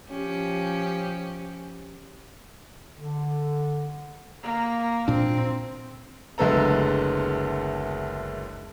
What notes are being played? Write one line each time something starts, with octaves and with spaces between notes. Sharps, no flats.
F3 C#4 G4
D3
A#3
A#2 C4 D4
F#1 D2 G#3 B3 A4 A#5